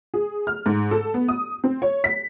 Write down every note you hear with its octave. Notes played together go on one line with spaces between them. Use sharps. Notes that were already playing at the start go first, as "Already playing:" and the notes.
G#4
F6
G#2
A4
B3
D#6
C4
C#5
B6